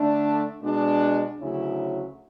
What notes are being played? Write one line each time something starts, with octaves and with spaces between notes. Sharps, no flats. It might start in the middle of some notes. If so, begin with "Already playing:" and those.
Already playing: D3 A3 D4
B2 G#3 D4
D2 C#3 F#3 C#4 E4